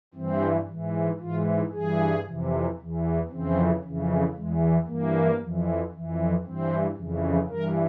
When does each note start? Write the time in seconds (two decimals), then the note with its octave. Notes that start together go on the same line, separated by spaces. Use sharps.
0.14 G2 E3 C4
0.67 G#2 E3
1.19 G#2 E3 F4
1.71 G2 E3 G#4
2.24 F2 C3 E3
2.76 E2
2.81 E3
3.29 F2 C#3 E3 C4
3.82 F2 C#3 E3
4.33 E2 E3 G#3
4.86 G2 E3 A#3
5.39 F2 E3
5.91 F2 E3
6.44 G2 E3 C4
6.96 F2 C#3 E3
7.48 G2 E3 A#4